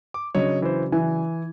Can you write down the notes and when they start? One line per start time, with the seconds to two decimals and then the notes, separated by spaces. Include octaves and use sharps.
0.14 D6
0.35 C#3 F#3 D4 C#5 D#5
0.62 E3 C5
0.92 E3 G#5